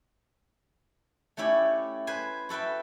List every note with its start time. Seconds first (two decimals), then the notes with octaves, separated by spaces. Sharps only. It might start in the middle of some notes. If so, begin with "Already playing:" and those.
1.37 A3 C#4 E4 G4 D5
2.07 B4 C5 G#5
2.49 F#4 A4 B4 E5 G5